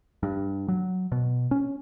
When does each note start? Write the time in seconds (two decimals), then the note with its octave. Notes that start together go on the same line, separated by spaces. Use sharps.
0.23 G2
0.68 F#3
1.12 B2
1.51 C#4